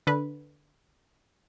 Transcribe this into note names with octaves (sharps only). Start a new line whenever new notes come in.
D3 B4